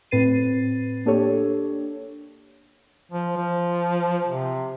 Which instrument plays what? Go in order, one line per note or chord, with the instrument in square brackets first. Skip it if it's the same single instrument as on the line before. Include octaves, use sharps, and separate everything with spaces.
[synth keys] A2 C4 B4 A6 C7 D#7
A#3 D4 G4 A4 C#5
[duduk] F3
F3
C3